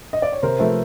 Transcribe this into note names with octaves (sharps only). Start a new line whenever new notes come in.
D#5
D5
C#5
C3 A#4 C5
F3 A3 A4 B4